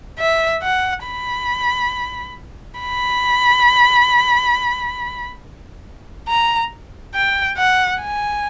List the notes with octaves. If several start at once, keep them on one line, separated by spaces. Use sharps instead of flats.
E5
F#5
B5
B5
A#5
G5
F#5
G#5